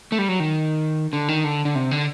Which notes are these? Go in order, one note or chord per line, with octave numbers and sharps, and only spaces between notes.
A3
G3
F#3
D#3
D3
D#3
D3
D3
C3
D3